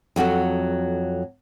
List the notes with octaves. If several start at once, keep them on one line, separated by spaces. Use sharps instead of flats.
F2 F#3 F#4 A4